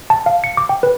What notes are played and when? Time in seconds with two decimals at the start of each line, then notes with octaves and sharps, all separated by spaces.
0.10 A5
0.26 F5
0.44 C#7
0.57 D6
0.69 G5
0.83 B4